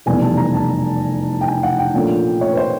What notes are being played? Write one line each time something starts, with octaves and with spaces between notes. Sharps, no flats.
F1 E2 B2 G3 B3 G#5
A5
A#5
A5
G5
G#5
F#5
G5
A#1 A#2 F3 A3 C#4
C#5
B4
C5